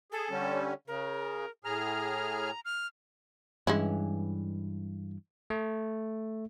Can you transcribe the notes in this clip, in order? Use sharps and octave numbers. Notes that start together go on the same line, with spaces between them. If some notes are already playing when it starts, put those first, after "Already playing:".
G#4 A4
D3 G3 C#4
C#3 A#4
A2 G#4 A#5 F6
F6
G2 E3 G#3 C#4 E4
A3